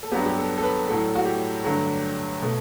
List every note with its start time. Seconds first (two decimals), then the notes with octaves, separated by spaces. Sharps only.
0.03 A4
0.12 G2 F#3 B3 G4
0.26 G4
0.38 A4
0.58 A4
0.63 B4
0.88 A2 F#3 A3 A4
1.15 F#4
1.25 G4
1.64 G2 D3 F#3 A3
2.42 B2 A3